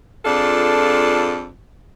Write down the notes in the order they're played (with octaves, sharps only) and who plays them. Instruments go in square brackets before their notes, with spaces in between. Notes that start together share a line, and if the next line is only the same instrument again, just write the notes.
[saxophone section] F2 D4 F4 G#4 A4